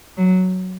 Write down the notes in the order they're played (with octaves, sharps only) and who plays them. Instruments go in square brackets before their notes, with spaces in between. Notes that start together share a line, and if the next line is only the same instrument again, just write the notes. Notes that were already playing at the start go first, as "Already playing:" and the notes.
[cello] F#3